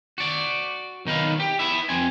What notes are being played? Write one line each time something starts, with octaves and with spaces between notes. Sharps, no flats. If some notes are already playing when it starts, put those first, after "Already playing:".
F#4 D5
B1 D#3 D#4 B4 F5
G4
B3 E4 E5
F2 C4 G#5